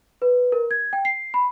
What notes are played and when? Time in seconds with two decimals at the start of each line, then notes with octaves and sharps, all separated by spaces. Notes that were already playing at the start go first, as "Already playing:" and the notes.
0.22 B4
0.52 A#4
0.71 G#6
0.93 G5
1.05 C7
1.34 B5